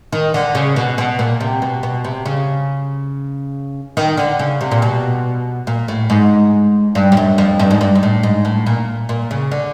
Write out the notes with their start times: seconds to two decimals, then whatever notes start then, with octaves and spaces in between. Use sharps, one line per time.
0.12 D#3
0.34 D3
0.55 C#3
0.76 B2
0.98 B2
1.19 A#2
1.40 C3
1.62 B2
1.83 B2
2.04 C3
2.25 C#3
3.97 D#3
4.17 D3
4.39 C#3
4.61 C3
4.71 A#2
4.82 B2
5.67 A#2
5.88 A2
6.10 G#2
6.95 G2
7.12 G2
7.17 F#2
7.38 F2
7.59 G2
7.71 G#2
7.81 G2
7.95 G#2
8.03 A2
8.23 G#2
8.45 A2
8.66 A#2
9.09 A#2
9.31 C#3
9.51 D3